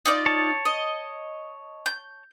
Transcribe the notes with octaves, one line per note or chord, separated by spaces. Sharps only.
D#4 F4 D5
C#5 A5
D#5
G6